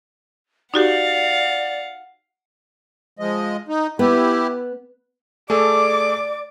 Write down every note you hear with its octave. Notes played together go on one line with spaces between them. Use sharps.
D#4 F#4 G4 D5 F5 F#5
F3 G#3 D#5
D#4
B3 E4 G4
A3 G#4 A4 D5 D6